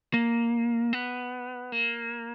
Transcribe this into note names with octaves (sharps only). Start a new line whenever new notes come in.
A#3
B3
A#3